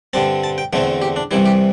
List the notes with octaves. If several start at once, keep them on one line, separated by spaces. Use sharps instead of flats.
G2 D3 G3 C4 A5
A5
G5
E2 D3 A3 C4 E5
G4
D4
C2 C3 E3 G3 E4
G4